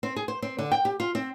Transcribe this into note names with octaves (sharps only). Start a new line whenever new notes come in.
C4
G#4
C5
C4
D3
G5
G4
F4
C4